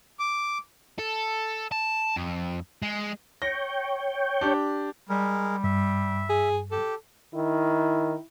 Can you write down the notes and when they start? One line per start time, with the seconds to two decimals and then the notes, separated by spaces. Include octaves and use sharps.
0.19 D6
0.99 A4
1.72 A5
2.16 F2
2.82 G#3
3.42 C#5 G5 A#6
4.41 D4 G4 G6
5.09 G3 G#3 A#4
5.64 G2 E5
6.29 G#4
6.71 G4 A4
7.35 D#3 E4